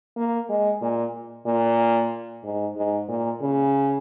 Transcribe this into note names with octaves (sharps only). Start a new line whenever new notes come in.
A#3
G#3
A#2
A#2
G#2
G#2
A#2
C#3